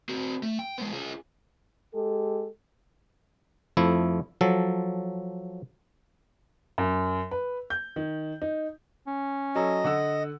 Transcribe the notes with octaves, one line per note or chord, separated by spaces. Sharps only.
C4 F#4
A3
G5
G#3 B3
F4 G#4
G#3 G4 A4
F2 F3 A3 E4
F3 F#3 A4
F#2
B4
G6
D#3
D#4
C#4
F#3 A4 D#5
D3 F#5 E6